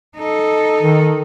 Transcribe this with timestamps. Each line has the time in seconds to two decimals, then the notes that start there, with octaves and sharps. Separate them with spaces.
0.16 D#4 A4
0.82 D#3